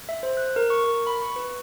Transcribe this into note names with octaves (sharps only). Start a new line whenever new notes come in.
E5
C5
F#6
A#4
C#6
A#4
B5
C#6
B4